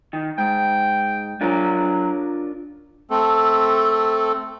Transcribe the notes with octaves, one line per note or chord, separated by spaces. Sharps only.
D#3
G#2 G5
F#3 D4 F4 A#4
A3 C4 A4